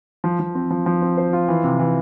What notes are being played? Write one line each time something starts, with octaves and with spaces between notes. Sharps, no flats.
F3
F3
C4
F3
F3
C4
C5
F4
E3
C3
E3